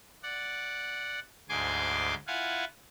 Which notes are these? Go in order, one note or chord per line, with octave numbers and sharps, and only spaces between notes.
D5 F#5
D2 G#2 G#5 C6 D6
E4 F4 F5 F#5 G#5